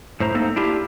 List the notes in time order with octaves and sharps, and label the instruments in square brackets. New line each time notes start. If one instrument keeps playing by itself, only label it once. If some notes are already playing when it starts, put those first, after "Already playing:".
[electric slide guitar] A2 C5 A#5
A3 A#3 C4 D#4 A4
D4 E4 F4 G4